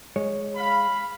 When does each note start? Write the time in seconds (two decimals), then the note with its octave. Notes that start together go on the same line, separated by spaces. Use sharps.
0.16 G#3 C#5
0.56 F5 B5